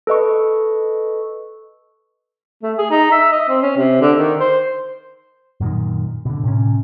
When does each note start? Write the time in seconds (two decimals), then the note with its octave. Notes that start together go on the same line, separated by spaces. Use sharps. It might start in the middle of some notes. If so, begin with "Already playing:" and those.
0.07 A4 B4 D#5 C#6
2.63 A3
2.78 G#4
2.91 D#4
3.12 E5
3.32 D#5
3.49 C4
3.63 C#4
3.77 C3
4.01 D3
4.17 D#3
4.40 C5
5.60 F#2 A#2 D#3
6.25 B2 D3
6.43 A2 C3 C#4